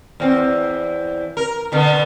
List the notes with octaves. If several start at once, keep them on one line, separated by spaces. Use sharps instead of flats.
E2 C4
A#4
B2 D3 B3